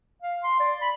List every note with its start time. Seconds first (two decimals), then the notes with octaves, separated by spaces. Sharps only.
0.22 F5
0.44 C6
0.60 D5
0.81 B5